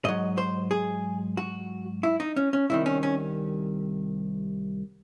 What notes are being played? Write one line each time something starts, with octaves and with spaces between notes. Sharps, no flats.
G#2 F#3 D#5
C5
G#4
F#4
E4
D#4
C#4
C#4
C2 C3 D#3 E4
C#4
C#4